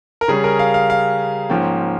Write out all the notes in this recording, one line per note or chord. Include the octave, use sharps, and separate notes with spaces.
A#4
C#3 G3 C#4 G#4
A#4
F5
F5
F5
G#2 F3 A#3 C#4 G5